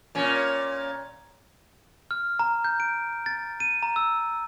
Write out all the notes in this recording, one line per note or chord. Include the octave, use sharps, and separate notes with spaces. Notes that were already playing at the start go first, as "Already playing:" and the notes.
A#2 C#4
F6
A#5
G6
D7
A6
D#7
A#5
E6